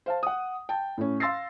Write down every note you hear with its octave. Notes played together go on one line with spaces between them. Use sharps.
C5 F5 A5
F#5 D#6
G5 A5
A2 C#4
F5 C6 E6 A6 A#6 C7